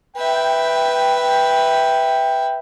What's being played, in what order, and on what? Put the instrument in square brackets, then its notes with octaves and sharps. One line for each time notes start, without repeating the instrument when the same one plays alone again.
[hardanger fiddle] B4 E5 [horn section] G5